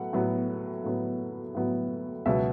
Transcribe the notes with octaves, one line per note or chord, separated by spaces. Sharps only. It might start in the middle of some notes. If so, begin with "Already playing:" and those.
Already playing: A2 F#3 B3 F#5
A2 F#3 B3
A2 F#3 B3
A2 F#3 B3
C#2 B2 F#3 B3 E5